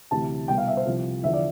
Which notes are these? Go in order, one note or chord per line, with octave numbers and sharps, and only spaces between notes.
D2 C3 E3 A5
C2 B2 G5
F5
E5
C5
C2 C3 F3
E2 D3 F3 E5
D5